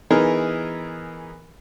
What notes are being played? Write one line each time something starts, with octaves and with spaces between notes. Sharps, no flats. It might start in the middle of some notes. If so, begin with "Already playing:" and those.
E3 B3 D#4 G#4 A#4